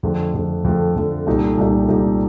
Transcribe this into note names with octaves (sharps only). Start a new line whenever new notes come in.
F2 D3 A3
F2 D3 A3
F2 D3 A3
F2 D3 A3
C2 A#2 A3 D#4 G4
C2 A#2 A3 D#4 G4
C2 A#2 A3 D#4 G4